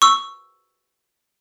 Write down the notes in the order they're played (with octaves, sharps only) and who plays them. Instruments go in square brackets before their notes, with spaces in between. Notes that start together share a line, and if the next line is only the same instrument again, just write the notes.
[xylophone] C#6 E6